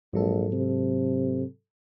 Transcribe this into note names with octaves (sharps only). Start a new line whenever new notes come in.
A#1 G#2 F#3 A4
C3